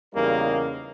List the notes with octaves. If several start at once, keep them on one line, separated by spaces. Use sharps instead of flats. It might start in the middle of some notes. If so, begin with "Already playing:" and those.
E2 C#3 G3 A#3 D#4 A#4